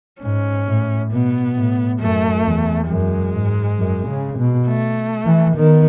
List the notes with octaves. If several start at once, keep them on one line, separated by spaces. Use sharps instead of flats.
G#2 C#4
A2
B2 B3
A2
F#2 A3
E2
F#2 G#3
G#2
F#2
C#3
B2
A3
E3
D#3 B3